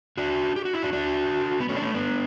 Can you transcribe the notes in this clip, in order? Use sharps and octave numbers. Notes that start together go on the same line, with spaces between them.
D4 F#4
G4
F#4
E4
D4 F#4
D4 F#4
B3
A3 C#4
D4
A3 C#4
B3 D4